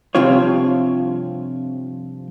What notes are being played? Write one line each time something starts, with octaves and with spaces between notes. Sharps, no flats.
G2 C3 F3 C4 F4 C#5